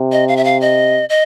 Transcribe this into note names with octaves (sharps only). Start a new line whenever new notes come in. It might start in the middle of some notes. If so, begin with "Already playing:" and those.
Already playing: C3
D#5
F5
E5
F5
D#5
D#5